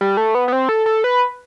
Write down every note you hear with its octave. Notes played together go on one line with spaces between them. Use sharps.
G3
A3
B3
B3
C4
A4
A4
B4